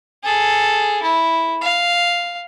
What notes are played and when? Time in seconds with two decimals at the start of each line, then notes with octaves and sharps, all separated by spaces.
0.23 G#4 A4
1.03 E4
1.61 F5